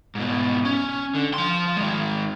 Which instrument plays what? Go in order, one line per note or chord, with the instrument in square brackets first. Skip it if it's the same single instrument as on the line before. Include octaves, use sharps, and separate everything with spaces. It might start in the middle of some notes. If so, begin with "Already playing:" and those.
[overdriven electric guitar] G#2 B2
C#4
D3
F3 C6
D#3 G#3